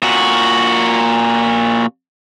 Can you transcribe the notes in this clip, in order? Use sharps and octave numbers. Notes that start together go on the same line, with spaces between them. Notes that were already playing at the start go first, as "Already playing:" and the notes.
A#2 F#4